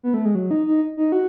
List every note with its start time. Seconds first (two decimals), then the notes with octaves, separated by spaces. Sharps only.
0.03 B3
0.14 A3
0.25 G#3
0.35 F#3
0.51 D#4
0.67 D#4
0.97 D#4
1.12 F#4